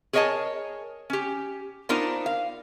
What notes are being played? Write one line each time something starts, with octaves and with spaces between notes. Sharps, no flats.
G#4 A#4 C#5 D#5 G#5 A5
C#4 G4
B3 D4 D#4 F4 A#4 C5
F5